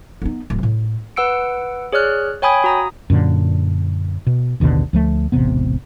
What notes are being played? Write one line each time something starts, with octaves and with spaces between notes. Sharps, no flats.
B3 D#4
D1
A2
B4 F#5 E6 C#7 D7
G#4 C#5 D5 F6 F#6
C#5 G5 G#5 B5 D#6 G#6
F#4 A#5 D#6
F#2 A#2 D3
B2
A1 D#2 B2 D3
D2 F3 A3
E1 A1 C3 B3